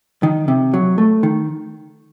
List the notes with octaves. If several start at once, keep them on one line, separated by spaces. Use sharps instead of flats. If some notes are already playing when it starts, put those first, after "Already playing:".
D#3
C3
F#3
A3
D#3